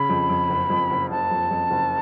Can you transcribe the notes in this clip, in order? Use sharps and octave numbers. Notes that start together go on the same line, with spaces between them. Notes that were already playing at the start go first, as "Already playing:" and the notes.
Already playing: C#3 B5
F2
F2
F#1
F2
F#1
F#1 A5
F2
F2
F#1